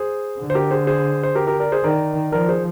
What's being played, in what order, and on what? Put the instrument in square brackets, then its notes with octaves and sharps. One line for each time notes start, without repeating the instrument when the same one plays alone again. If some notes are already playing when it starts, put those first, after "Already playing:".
Already playing: [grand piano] G#4 C5
[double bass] D3
[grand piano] C5
G4 A#4
G#4 C5
G#4 C5
C5
G4 A#4
G4 A#4
A#4 D5
G#4 C5
[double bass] D#3 [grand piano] A#4 D5
[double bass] F3 [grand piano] A#4 D5
[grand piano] G#4 C5